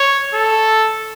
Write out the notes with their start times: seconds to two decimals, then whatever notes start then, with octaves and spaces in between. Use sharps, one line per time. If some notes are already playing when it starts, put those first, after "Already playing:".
Already playing: C#5
0.34 A4